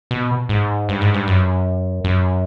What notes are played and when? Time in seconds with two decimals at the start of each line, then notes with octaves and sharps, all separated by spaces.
0.11 B2
0.49 G#2
0.89 G2
1.01 G#2
1.14 G2
1.27 F#2
2.04 F#2